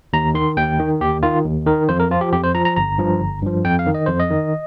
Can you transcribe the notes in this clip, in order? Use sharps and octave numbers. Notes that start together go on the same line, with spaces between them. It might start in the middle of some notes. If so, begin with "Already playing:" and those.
D#2 A#5
D#3 C6
D#2 G5
D#3
D#2 G4
D#3 F4
D#2
D#3 A#4
F2 C5
A#4
F3 F4
G4
F2 G4
C5
F3 A#5
A#5
G1 A#5
G2 F3
G1
G2 F3
F2 G5
F5
D#3
D#5
F2 C5
D#5
D#3